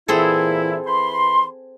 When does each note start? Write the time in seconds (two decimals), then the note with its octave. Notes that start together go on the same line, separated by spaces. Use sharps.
0.08 A#2 E3 C4 E4 G#4 A4
0.86 E3 B5 C6